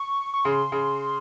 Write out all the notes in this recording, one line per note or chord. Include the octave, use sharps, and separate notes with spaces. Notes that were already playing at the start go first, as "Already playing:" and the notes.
Already playing: C#6
C#6
C#3 C6
C#3